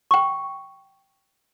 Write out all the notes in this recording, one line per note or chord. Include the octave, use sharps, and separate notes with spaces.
G5 C#6